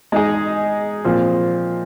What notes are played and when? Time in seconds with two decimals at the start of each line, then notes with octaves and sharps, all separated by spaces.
0.12 G#3 D#4 G#4 D#5
1.04 A#2 F3 C4